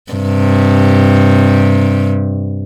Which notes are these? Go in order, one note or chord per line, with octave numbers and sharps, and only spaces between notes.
G2 C3